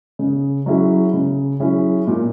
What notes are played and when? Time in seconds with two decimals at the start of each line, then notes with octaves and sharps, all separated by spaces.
0.19 C#3
0.66 F#3 C#4 E4 G#4
1.14 C#3
1.60 F#3 C#4 E4 G#4
2.07 A#2